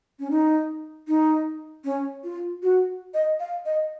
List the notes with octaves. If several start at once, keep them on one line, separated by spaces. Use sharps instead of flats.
C#4
D#4
D#4
C#4
F4
F#4
D#5
F5
D#5